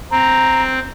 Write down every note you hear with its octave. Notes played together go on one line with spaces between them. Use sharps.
C4 A#5